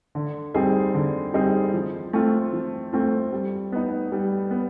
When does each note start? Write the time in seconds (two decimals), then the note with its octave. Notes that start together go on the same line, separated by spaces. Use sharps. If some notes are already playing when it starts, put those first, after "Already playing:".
0.15 D3
0.54 G3 C4 D#4 G#4
0.94 D3
1.34 G3 C4 D#4 G#4
1.74 F3
2.13 A3 C4 F4
2.53 F3
2.93 A3 C4 F4
3.32 G3
3.72 B3 D#4
4.12 G3
4.51 B3